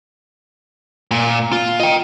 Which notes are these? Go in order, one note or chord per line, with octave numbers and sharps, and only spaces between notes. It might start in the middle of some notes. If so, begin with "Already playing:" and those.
A#2
F4
D#5 G5